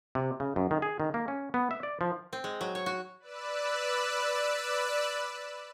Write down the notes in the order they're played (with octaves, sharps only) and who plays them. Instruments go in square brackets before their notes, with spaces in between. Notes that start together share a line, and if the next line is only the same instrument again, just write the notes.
[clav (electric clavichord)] C3
C#3
F#2
D#3
G#4
D#3
A#3
C#4
B3
E5
D5
F3
[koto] C4
G#3
F#3
C#5
F#4
[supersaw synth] B4 D5 E6 F#6